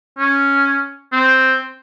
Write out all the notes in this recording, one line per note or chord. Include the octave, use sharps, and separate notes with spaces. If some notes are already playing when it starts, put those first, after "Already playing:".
C#4
C4